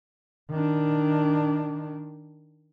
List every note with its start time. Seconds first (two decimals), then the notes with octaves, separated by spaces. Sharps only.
0.51 D#3 D4